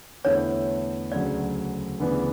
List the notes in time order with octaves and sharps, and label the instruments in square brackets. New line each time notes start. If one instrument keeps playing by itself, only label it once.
[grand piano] E2 D3 A3 E4 [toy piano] C#5
[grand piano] D2 C#3 F#3 [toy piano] D5
[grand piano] D2 C#3 E3 B3 D4